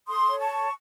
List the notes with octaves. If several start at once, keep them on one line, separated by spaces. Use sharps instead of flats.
A4 C6 D#6
C#5
A5 C#6
A4